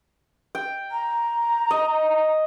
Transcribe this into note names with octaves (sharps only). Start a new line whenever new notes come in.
G5
A#5
D#5